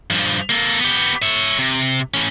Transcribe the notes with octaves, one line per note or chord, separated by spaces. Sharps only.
G2 F3
A#3 A4
B3 G4
C#5 E5
C3
A2 C#4